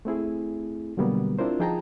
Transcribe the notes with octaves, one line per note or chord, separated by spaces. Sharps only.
A3 C4 E4 G#4
B2 D3 F#3 G3 A#3 B3
C4 D4 E4 F4 A#4 C5
F3 D#4 G#4 G5 A5 A#5